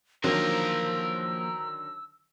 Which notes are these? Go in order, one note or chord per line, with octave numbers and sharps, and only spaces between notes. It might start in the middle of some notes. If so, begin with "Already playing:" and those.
D3 D#3 F3 F#3 A#3 A#4 C5 E6